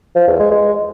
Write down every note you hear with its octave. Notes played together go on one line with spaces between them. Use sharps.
F3
E2
G#3
G#3